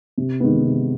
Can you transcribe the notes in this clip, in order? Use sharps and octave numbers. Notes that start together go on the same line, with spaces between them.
C3
D#3 G#3 B3
C3